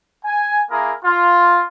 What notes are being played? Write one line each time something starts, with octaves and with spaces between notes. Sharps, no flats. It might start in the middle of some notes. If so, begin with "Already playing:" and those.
G#5
A#3 E4 G#4 A#4
F4